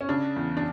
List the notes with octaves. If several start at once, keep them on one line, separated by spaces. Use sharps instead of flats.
C#4
C#3 D4
E2
D4